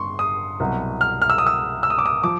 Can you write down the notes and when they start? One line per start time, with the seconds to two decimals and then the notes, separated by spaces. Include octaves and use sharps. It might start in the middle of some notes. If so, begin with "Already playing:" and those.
Already playing: G1 G2 C6 C#6
0.19 D#6
0.60 C2 B2 F#3
1.01 F6
1.22 F6
1.30 E6
1.38 D#6
1.47 E6
1.83 E6
1.90 D#6
1.98 D6
2.06 D#6
2.23 F3 D6